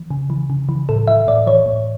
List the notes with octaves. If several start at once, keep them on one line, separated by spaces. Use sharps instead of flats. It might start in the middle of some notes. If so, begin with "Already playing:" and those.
Already playing: E3
C#3
E3
C#3
E3
A2 A4
E3 E5
A2 D5
E3 C#5
A2